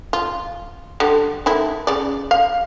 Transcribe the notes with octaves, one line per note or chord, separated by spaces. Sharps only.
F4
D3 G3
D#3 A3 E4
C#3 D5
F5